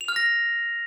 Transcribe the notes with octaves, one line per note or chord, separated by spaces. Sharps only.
F7
F6
A#6